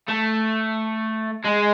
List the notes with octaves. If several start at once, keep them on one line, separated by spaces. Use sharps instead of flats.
A3
G#3